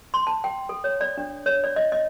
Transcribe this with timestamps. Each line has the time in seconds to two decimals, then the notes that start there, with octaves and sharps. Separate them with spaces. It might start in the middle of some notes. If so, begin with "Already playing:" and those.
0.14 C6
0.27 A5
0.44 G5
0.69 A4
0.84 C#5
1.01 D5
1.17 D4
1.46 C#5
1.64 D5
1.76 D#5
1.92 D#5